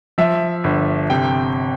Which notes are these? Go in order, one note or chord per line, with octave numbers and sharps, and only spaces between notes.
F3 E5
G1
C3 G5